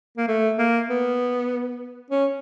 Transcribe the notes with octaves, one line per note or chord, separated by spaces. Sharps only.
A#3
A3
A#3
B3
C#4